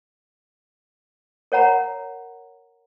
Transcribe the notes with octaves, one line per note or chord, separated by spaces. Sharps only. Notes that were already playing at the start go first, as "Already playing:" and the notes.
A#4 C#5 F#5 A#5 B5